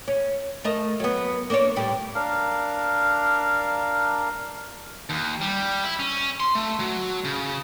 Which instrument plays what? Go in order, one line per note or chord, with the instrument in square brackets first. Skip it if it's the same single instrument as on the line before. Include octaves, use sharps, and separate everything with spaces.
[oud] C#4
A3 A#4 D#5
F#3 B3
A#3 D4 C#5
A2 G3
[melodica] D4 A#4 F5
[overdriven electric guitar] D#2
G3
E4
C#4
C6
A3
F#3
C#3